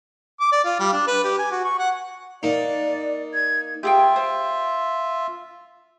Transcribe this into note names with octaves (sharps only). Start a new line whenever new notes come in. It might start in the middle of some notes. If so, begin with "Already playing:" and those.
D6
D5
F4
G3
D4
B4
G4
G#5
F#4
C#6
F#5
A#3 D#4 D5
G#6
F4 G4 G#4 E5 G5
C5